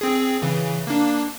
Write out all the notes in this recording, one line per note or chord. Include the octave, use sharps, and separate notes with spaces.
C4 G#4
C#3 E3
A#3 D4